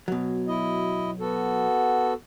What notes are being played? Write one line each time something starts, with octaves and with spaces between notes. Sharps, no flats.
B2 F#3
E4 D#5
B3 F#4 A4